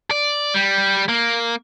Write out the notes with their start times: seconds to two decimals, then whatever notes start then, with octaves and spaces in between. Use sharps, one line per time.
0.11 D5
0.54 G3
1.09 A#3